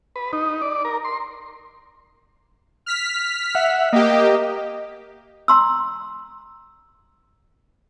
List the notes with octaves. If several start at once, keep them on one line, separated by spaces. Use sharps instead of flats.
B4
D#4
D5
A#4
C6
F6 B6
E5 F#5
A#3 G4 D#5
A#5 C6 E6